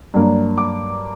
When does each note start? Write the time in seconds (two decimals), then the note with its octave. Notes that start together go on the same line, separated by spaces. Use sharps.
0.14 G2 F#3 A#3 D4
0.58 D6